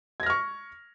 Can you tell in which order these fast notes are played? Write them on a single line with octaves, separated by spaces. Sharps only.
G#6 A#6 F6 C#6